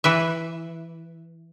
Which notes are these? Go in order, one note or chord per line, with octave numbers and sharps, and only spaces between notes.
E3 B4 E5